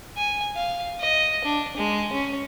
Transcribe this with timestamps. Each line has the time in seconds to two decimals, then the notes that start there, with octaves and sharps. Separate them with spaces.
0.17 G#5
0.55 F5
1.00 D#5
1.44 D4
1.76 G#3
2.13 C#4